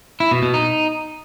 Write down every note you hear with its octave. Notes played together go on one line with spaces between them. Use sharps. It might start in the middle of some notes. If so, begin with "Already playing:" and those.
E4
B2
B2
D#4